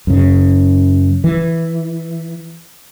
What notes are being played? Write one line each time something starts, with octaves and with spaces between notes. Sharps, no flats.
F#2 C#3
E3